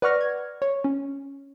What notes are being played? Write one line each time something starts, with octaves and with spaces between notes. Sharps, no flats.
B4 D5 F#5 C#6 F6 A#6
G#6
C#5
C#4